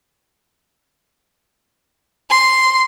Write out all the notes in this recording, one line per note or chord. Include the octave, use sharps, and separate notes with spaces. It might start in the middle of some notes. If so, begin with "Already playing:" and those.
C6